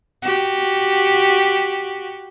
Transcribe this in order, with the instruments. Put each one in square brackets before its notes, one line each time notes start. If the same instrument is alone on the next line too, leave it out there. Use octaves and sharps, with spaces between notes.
[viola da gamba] F#4 G4